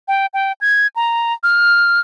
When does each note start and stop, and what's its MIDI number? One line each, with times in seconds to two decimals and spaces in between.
0.08 0.26 79
0.34 0.52 79
0.61 0.87 92
0.96 1.33 82
1.43 2.00 89